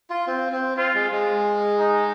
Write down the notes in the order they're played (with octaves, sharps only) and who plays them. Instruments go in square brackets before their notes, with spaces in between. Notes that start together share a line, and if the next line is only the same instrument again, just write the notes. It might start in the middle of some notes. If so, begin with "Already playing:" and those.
[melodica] F4
C4
C4
[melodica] C4 [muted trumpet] F4
[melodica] G#3
G#3
[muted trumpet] D#4